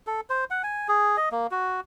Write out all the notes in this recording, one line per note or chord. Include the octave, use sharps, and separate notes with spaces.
A4
C5
F#5
G#5
G#4
D#5
A#3
F#4